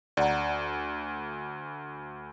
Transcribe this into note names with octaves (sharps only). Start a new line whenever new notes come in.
D2 D5 F#5 A#5